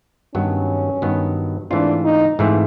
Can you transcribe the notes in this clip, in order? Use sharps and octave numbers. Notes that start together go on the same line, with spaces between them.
G2 D#3 F#3 B3 C#4
G2 D#3 F#3 B3
G#2 E3 A3 C4 D4 F4
D#4
G#2 E3 A3 C4 F4